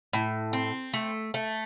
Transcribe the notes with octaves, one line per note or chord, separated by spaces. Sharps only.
A2
C4
A3
A3